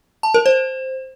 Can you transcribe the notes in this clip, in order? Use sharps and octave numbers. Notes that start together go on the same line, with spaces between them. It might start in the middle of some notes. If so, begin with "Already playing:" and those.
A5
A#4
C5